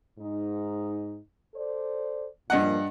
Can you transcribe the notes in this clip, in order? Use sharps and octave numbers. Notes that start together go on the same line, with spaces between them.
G#2 D#4
A4 C5 D5
G2 A#2 F3 A#3 D#5 F#5